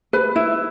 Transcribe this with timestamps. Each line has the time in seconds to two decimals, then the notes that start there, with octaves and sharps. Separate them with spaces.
0.13 B4
0.36 E4